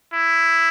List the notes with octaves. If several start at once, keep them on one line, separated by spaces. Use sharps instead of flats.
E4